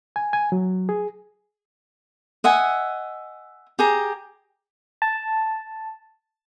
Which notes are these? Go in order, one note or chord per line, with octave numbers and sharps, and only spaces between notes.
G#5
G#5
F#3
G#4
D#5 E5 F#5 G#5
G4 G#4 A#5
A5